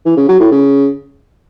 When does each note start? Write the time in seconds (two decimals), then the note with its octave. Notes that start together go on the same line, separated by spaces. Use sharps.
0.06 E3
0.17 C#3
0.29 F#3
0.40 A2
0.51 C#3